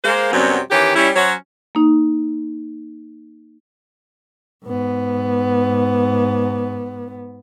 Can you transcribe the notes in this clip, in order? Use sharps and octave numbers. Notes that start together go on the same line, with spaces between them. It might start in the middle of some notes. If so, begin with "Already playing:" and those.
G#3 A#3 C5
F#2 C3 F#3 G3 B3 C4
D#3 E3 C#4 G4
G3 C#4 E4
F#3 C#4 F#4 C5 C#5
A#3 D#4
G#2 B3